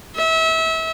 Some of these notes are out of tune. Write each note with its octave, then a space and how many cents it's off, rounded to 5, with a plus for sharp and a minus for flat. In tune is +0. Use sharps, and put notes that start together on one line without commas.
E5 -30